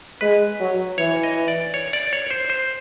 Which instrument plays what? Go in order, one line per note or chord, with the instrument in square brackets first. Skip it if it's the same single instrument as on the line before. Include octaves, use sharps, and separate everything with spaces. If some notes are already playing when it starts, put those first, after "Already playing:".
[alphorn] G#3 [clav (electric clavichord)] B4
[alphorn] F#3
[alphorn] E3 [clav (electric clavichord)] C#5
[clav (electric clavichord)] D#5
D5
C#5
D5
C#5
C5
C5